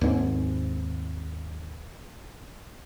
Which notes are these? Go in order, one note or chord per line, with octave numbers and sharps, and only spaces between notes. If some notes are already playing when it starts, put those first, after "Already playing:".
D#2 G#2 C4